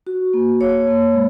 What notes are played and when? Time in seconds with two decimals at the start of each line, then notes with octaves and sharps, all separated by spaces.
0.07 F#4
0.34 A#3
0.61 C#5
0.87 A#3
1.14 G#3